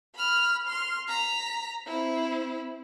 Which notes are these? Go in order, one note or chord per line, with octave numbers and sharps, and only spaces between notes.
B5 F6
C6 F6
A#5 B6
C4 E4